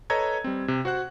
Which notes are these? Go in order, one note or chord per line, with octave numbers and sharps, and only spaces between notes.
A4 B4 C#5 D#5 A#5 G#6
G3 C4
C3
F#4 C5 F#5 F#6